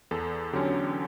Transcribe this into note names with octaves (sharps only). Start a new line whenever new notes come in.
E2 A4
D3 F#3 C#4 G4